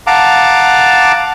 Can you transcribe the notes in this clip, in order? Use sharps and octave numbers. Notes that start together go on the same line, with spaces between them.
F5 F#5 A5 A#5 D6